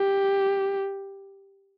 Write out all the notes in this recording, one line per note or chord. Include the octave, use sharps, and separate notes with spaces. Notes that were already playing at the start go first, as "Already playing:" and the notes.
Already playing: G4